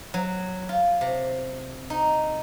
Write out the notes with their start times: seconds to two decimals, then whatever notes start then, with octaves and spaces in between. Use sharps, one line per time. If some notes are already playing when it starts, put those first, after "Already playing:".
0.14 F#3
0.69 F4
1.01 C3
1.90 D#4